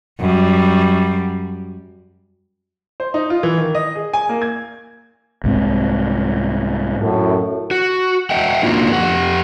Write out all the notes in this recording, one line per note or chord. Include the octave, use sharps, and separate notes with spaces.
F#2 G3
C5
D#4
F4
E3
D#3
D#5
G#4
G#5
A#3
G#6
C2 G#2 C4
F#2 A2
F#4
D#5 E5 F#5 G5
A#3 D4 D#4 F4 F#4
F2 G4 F#5